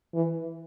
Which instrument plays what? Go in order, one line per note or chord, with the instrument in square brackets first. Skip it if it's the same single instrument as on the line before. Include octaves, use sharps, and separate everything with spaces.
[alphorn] E3